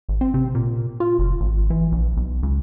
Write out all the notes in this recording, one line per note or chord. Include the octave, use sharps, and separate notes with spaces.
G#1
C4
C3
A#2
F4
F#1
G#1
E3
A#1
B1
C#2